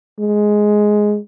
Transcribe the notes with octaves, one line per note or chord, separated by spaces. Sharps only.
G#3